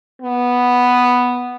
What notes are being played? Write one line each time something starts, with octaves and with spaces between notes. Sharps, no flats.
B3